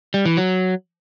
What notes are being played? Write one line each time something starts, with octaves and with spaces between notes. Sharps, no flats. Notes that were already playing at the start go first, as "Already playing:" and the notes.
G3
E3
F#3